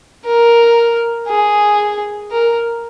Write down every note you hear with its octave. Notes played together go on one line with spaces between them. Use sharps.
A#4
G#4
A#4